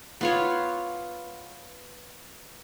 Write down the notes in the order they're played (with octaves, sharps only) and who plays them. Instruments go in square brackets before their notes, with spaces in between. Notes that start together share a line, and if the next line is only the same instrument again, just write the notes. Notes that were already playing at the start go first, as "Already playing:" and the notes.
[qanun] B3 F4 C#5